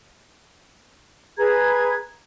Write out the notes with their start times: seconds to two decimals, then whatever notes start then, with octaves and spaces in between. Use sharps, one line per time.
1.38 G#4 B4 A#5 G#6